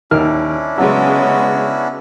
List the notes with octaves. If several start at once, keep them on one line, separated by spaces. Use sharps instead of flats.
D#2 C#4 D4 E4 A#4 F6
C#3 F#3 G#3 B3 F#4